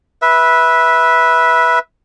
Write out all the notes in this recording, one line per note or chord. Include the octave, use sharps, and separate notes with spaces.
B4 E5